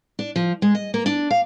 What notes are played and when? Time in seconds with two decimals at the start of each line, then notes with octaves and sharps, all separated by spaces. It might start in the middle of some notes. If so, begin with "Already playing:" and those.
0.19 D4
0.36 F3
0.62 G#3
0.75 D#5
0.94 A#3
1.06 D4
1.31 F5